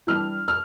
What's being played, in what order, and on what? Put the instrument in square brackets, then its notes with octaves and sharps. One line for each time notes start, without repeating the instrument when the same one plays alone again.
[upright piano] E3 G3 D4 F6
F6